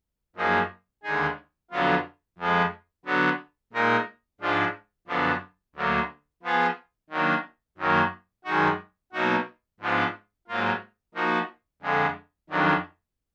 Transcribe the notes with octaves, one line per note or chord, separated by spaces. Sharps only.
F#2 F3 A#3 D#4 G#4
D#2 D3 G#3 D#4 G#4
F2 D3 F#3 B3 F4
F2 F3 G#3
D3 F#3 B3
A#2 G#3 D#4 A#4
G#2 F3 G#3 D4 F4
F#2 D3 F3 B3 D4
D2 D3 F#3 A#3
F3 B3 F4 G#4
D#3 F#3 A#3 D4
F#2 D#3 F#3 A#3
F#2 D#3 G#3 D#4 F#4
B2 F#3 A#3 D#4 F#4
G#2 F3 B3 D4 F4
G#2 F#3 A#3 F4
F3 A#3 D#4 F#4
F2 D3 G#3
F2 D#3 F#3 D4